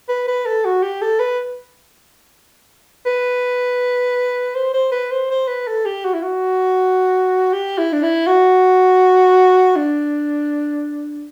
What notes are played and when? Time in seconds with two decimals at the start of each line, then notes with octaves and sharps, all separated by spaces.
0.09 B4
0.28 B4
0.46 A4
0.65 F#4
0.83 G4
1.02 A4
1.20 B4
3.06 B4
4.55 C5
4.74 C5
4.92 B4
5.11 C5
5.30 C5
5.48 B4
5.67 A4
5.85 G4
6.05 F#4
6.14 E4
6.23 F#4
7.53 G4
7.78 E4
7.93 D4
8.03 E4
8.27 F#4
9.76 D4